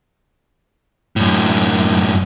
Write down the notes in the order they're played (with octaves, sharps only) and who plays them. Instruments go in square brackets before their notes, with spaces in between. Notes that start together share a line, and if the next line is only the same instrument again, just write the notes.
[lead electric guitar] F#2 A2